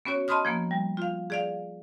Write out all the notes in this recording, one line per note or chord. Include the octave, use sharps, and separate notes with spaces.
B3 C#4 F#4 C#5
D#5 A5 B5 C6 D#6 F6
F3 A#3 B3
G3
F4 F5
G#4 D5 F5